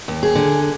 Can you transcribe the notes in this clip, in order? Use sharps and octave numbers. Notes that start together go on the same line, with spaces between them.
D#2
G#4
D3